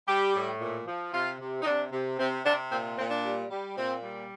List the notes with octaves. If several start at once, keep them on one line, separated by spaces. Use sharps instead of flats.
G3 G4
A2
A#2
F3
C3 F4
C3
D#4
C3 D4
C3
C3 C4
C3 D4
A#2 C4
A#2 C4
D4
G3
G3
A#2 C4
G3